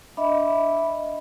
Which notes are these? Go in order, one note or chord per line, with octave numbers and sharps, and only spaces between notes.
D4 D#5 E5 B5